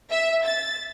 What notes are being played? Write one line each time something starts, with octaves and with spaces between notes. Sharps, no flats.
E5
A6